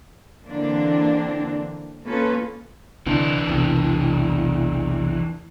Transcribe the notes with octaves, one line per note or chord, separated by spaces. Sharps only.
D3 E3 A#3 C4 D4
A#3 C#4 F4 A4 B4
C2 D3 E3 C4 D4
B1 E2 C3